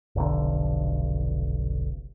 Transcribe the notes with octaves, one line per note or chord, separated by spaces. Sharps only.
F1 B1 D3